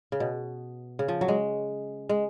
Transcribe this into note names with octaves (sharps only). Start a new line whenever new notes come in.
C#3
B2
C#3
F3
F#3
G#3
G#3